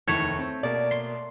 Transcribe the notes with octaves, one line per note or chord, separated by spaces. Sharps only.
F1 D#2 E3 A3 C#5
C4
B2 A#3 D5
C6